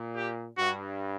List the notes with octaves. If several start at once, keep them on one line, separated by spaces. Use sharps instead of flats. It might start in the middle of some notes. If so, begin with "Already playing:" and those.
Already playing: A#2
G4
G2 F#4